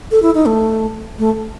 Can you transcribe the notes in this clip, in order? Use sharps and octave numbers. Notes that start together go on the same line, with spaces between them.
A4
E4
D#4
A3
A3